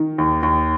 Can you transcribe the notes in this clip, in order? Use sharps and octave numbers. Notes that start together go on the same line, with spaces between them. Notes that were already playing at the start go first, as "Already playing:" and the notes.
Already playing: D#3
D#2
D#2